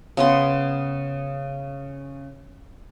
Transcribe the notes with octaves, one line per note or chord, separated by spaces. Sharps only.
C#3 B3 C6